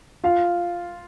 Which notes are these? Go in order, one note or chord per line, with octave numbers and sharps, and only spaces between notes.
F4 F5